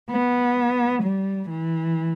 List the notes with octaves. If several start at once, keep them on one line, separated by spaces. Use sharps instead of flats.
B3
G3
E3